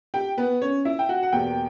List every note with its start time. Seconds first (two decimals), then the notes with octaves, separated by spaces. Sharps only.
0.14 G4 G5
0.38 B3 B4
0.62 C#4 C#5
0.85 E4 E5
0.99 G5
1.09 F#4 F#5
1.23 F#5
1.32 E2 B2 A#3 G4 G5